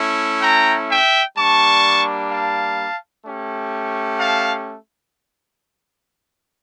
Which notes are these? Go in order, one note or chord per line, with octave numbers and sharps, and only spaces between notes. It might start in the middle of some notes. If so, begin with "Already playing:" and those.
Already playing: A3 C#4 E4
G5 A#5
E5 G5
G3 A#3 D4 A5 C#6
F5 A5
A3 C#4 G4
F5 A5